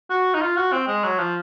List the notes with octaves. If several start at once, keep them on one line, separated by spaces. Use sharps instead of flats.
F#4
D#4
F4
F#4
C4
G#3
F#3
F3